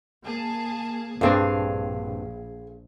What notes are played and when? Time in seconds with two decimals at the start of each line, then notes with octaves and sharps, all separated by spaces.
0.25 A#3 G#4 A5
1.21 A#1 G2 C4 D4 G#4 F5